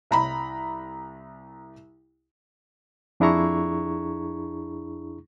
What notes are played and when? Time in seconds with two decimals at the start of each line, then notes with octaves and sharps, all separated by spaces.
0.11 C2 A#5 B5
3.20 F2 D4 E4 G#4 A#5 C#6